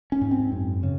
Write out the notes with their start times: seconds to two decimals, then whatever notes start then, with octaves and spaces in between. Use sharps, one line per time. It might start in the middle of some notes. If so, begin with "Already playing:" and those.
0.12 C#4
0.21 G#2
0.31 C4
0.52 F#2
0.83 C#3